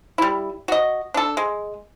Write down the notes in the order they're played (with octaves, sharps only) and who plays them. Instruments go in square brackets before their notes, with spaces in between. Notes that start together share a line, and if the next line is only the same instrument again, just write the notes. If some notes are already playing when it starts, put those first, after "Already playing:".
[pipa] G3 E4
F#4 D#5
D4 A4
G#3